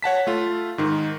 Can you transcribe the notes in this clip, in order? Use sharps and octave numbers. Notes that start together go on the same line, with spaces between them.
C#5 F#5 A5 B6
A3 F4
G#2 D#3